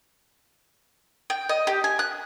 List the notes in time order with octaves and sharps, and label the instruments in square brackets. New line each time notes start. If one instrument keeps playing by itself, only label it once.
[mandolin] G5
D#5
G4
G#5
F#6